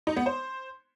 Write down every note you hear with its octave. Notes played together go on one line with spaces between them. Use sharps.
D#4
B3
C5